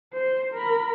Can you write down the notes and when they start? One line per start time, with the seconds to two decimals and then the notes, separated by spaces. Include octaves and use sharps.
0.13 C5
0.54 A#4 B5